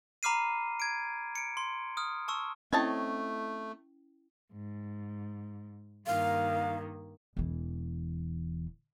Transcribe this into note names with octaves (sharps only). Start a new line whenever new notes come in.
A#5 B5 D6 F6 C7 D#7
G#6 D7
C#7 D7
C6
D#6 F6
A5 C#6 E6
A3 C4 C#4 E4 C#5 D#5 G5 A5
G#2
G2 D#3 A#3 F5
E1 E3